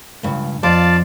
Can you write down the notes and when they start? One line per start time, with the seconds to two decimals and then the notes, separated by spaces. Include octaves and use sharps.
0.23 C#2 G2
0.63 F2 F4 D5 A5